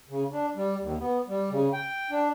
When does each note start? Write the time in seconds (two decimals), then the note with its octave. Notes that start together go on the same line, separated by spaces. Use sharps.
0.09 C#3
0.32 D4
0.56 G3
0.81 D#2
0.99 B3
1.28 G3
1.50 C#3
1.73 G5
2.11 D4